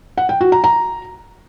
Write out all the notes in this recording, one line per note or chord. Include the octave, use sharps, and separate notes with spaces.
F#5
G5
F#4
A#5
A#5